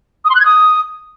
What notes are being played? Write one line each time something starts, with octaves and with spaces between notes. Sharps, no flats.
D#6
C6
F#6
G#6
D#6